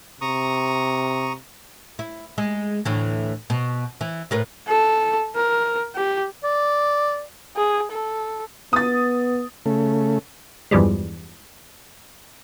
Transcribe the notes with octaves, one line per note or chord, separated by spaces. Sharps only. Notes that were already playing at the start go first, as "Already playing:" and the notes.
C3 A#5 C#6 D#6
E4
G#3
D2 A2 E3
B2
E3
A2 A#4 B4
A4
A#4
G4
D5
G#4
A4
B3 D#6 A6
C#3 A3
E2 G2 E3 F3 G3 G#3